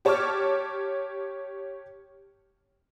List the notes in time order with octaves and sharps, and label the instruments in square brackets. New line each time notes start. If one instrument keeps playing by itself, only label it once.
[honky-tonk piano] G4 C#5 A5 C#6 D6 F6